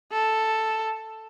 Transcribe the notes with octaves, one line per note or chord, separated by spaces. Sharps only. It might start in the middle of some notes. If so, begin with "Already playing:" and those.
A4